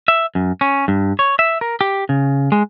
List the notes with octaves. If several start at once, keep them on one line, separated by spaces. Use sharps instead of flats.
E5
F#2
C#4
G2
C#5
E5
A#4
G4
C#3
G#3